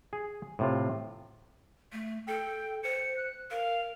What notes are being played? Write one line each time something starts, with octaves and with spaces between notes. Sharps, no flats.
G#4
A2 C3 F4
A3
A4 G5
C5 C#7
F#6
A#4 F5